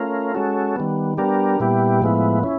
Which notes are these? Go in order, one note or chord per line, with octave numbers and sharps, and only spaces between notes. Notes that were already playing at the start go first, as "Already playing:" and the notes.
Already playing: A3 C#4 F4 A#4
G#3 C#4 F#4 A4
D#3 G3 B3
G3 B3 D4 G4 A#4
A#2 G3 B3 E4 G4
A2 F3 G#3 B3 E4
C#4 E4